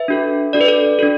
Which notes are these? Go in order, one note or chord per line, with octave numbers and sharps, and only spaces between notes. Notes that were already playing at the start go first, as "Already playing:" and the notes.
Already playing: B4 E5
D4 F#4 A4
D4 F#4 A4 D5
B4
A4 D5
D4 F#4 A4